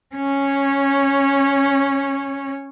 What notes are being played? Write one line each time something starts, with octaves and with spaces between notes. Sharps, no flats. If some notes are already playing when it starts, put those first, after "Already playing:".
C#4 C#5